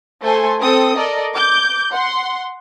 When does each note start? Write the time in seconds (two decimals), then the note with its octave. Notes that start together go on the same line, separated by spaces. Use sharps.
0.22 A3 A4 C5 G#5 C6
0.60 C4 A4 D#6
0.96 A4 A#4 D5 D#5
1.35 D6 G6
1.92 F#5 C6